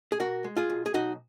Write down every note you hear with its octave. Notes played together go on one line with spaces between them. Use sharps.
G#4
B2 F#4 A#4
G#3
F4 G#4
B1
G#4
B1 D#4 F#4